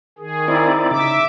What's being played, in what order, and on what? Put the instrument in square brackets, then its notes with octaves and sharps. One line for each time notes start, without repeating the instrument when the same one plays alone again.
[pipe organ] D#3 G#4
[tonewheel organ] C4 E4 D5 [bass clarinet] D#4
[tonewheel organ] C#3 [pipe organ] E5 D6